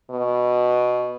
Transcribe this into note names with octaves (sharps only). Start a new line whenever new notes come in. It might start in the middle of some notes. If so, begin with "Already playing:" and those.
B2